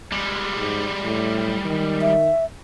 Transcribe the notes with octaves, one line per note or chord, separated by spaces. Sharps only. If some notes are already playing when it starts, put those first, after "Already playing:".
G3 G#3
G#2
A2
D#3
E5